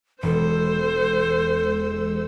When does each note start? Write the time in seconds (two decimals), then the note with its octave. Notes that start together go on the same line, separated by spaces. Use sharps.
0.23 E1 E2 G#3 A4 C5 E6